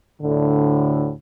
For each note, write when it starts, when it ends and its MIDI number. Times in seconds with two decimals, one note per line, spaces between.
0.22 1.11 38
0.22 1.11 45
0.22 1.11 50